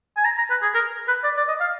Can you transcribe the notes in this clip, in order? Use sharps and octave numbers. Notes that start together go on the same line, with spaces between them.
G#5
A#5
A#5
B4
G#4
A#4
B4
D5
D5
D#5
F5